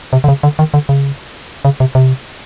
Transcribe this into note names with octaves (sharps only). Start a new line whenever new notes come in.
C3
D3
C#3
D3
D#3
D3
C#3
C#3
C3
C3